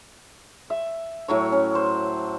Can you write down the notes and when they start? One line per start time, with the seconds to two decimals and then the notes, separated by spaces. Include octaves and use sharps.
0.70 E5
1.28 A2 F#3 C#5
1.52 C#4
1.75 C5